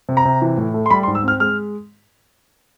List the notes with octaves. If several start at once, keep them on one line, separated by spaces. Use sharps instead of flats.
C3
A#5
C3
E3
A2
A3
C6
G3 B5
C6
G#2
E6
C4 F6
G#3 F6